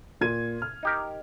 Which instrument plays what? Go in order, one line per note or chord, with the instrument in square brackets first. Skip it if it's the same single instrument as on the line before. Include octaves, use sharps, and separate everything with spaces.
[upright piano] A#2 G#6 D#7
F6
[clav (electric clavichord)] D#4 G4 A#4